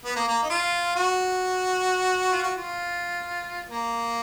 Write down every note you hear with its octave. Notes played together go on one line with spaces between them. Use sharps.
B3
A#3
A#3
D#4
F4
F#4
F4
F#4
F4
A#3